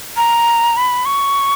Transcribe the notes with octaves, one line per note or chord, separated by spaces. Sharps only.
A#5
B5
C#6